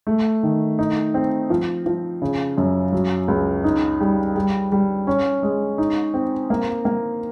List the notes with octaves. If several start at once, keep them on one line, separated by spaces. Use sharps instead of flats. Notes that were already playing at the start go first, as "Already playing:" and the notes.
A3
D#3
D#4
C4
F3
F3
C#3
F#2
F#3
C#2
D#4
G3
G3
G3
C#4
G#3
D#4
C4
A#3
A#3